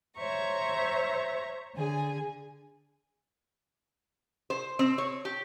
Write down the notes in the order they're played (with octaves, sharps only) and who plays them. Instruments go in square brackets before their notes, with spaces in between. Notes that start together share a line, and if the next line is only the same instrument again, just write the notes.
[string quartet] C5 C#5 E5 A#5 C#6
D3 G#4 G#5
[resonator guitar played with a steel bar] C5
C4
C#5
G4